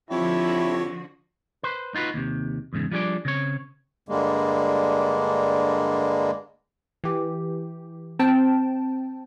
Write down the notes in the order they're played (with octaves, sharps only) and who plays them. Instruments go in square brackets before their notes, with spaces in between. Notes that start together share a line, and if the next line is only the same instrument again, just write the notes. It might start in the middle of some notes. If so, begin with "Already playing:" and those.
[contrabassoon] F2 [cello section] D3 F3 F#4 [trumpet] E4 [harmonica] G4 A4 C#5
[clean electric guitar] B4 C5
D#4 F4 F#4 B4
D#2 C3
E2 G#2 C#3
F3 G3 D4 G#4 D5
C#3 C4 C#5
[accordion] G2 D3 G3 G#3 A#3
[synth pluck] E3 G4
C4 G5 A5